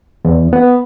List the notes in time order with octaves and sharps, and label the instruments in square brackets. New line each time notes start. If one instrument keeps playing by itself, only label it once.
[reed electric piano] E2
B3